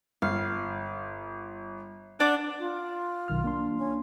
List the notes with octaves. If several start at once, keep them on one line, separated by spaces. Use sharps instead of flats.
G1 F5
D4 D5 F#5 D6
F4
B1 D#3 F6
A#3 D4 C6
C#4